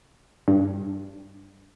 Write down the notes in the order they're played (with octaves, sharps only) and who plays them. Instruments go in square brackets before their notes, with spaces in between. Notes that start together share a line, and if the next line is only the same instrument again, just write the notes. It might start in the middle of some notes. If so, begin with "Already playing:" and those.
[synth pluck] G2